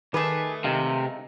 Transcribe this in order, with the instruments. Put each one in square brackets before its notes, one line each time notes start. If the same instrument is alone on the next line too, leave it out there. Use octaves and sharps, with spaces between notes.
[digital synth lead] D#3 [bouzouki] A3 B4 [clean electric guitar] G4 G#4 A5
[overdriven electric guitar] C3 [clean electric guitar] G#3 D#4 F5